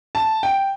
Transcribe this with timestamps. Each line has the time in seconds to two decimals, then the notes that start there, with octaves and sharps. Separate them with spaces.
0.15 A5
0.43 G5